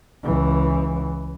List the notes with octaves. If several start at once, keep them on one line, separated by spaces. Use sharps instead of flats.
C#2 E3